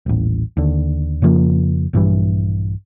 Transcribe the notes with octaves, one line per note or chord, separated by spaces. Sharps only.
D#1 A1
D#2 D3
F2 C#3 F3 A#3
A#1 G2 E3 G3